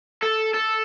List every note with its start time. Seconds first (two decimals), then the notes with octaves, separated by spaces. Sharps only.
0.23 A4
0.54 A4